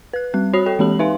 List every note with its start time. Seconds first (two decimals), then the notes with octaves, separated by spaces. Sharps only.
0.13 B4 F#6
0.34 G3 C4 F#6
0.53 F#4 C#5 B5 D#6 C7 F7
0.66 A4 C#5 G5
0.79 E3 G#3 C4 G4 B5 F#7
0.99 D#4 B4 E5 F5 G#5 C6